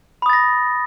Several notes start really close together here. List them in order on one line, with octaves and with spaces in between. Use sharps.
B5 D#6 A6 A#6